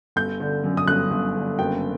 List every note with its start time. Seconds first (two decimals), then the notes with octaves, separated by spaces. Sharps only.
0.16 G1 G6
0.40 D3
0.64 F#2
0.77 D#6
0.88 G1 F#6
1.11 G1
1.36 D3
1.59 F#1 G5